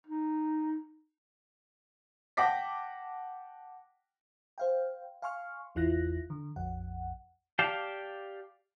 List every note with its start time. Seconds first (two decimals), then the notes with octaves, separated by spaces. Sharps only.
0.07 D#4
2.37 F#5 G5 A5 D6 A#6 B6
4.58 C5 F5 G5
5.22 F5 G#5 C6 C#6 F6
5.75 G#1 E2 E4 F4 F#6 A#6
6.30 D3
6.56 A#1 F2 F#5
7.59 G4 D5 F5 G5 A5